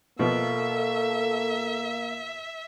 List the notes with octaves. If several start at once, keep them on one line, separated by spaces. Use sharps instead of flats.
B2 F3 A#3 B3 A4 E5